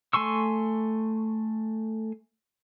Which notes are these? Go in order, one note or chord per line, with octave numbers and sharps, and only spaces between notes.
A3 G#5 C6 C#6 E6